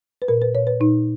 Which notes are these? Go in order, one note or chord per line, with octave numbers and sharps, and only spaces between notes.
B4
A#2 A#4
B4
A#2 C#5
B4
A#2 D#4